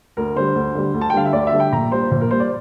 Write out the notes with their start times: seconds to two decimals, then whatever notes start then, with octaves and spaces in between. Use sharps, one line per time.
0.17 D2 A#4
0.36 D3 G3 C5
0.55 D2
0.75 D3 G3
0.94 D2
1.01 A5
1.10 G5
1.14 D3 G3 F5
1.25 E5
1.33 D2 D5
1.47 E5
1.52 D3 G3
1.60 G5
1.72 A#1 A#5
1.92 A#2 G3 C5
2.11 A#1 C5
2.21 A#4
2.31 A#2 G3 C5
2.40 D5